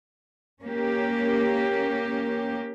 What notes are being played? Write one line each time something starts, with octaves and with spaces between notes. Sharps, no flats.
A#3 C#4 G4